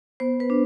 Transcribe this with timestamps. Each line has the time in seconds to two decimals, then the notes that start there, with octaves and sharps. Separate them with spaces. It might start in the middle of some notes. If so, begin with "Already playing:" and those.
0.20 B3 C5
0.40 B4
0.50 D4